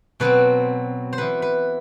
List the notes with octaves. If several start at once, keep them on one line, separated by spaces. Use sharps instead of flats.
B2 F#3 C4 B4
C5
E3 B3 B4
B4